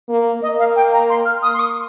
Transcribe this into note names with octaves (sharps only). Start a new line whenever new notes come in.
A#3
A#3 D#5
F5
G5
A#5
C6
F6
D#6
C6
D#6